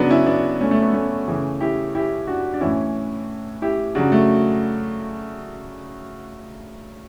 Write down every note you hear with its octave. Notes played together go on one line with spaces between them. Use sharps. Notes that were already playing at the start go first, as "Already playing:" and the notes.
Already playing: C#3 F#3 B3 D4
C#4 E4
B3 D4
A3 C#4
A3
B3
A3 C#4
C#3 E3
E4 G4
E4 G4
D4 F#4
D4
A2 E3 C#4 E4
E4 G4
C#3 F#3 D4 F#4
A3